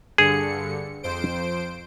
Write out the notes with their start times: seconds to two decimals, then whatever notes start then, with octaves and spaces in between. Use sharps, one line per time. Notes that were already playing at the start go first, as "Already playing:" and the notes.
0.18 G2 D3 G#4 C#7
1.03 F2 C5 D7